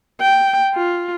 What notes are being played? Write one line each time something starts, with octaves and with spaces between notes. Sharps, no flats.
G5
F4